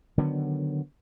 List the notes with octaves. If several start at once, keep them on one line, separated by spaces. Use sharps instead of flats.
D3 D#3 F#3 B3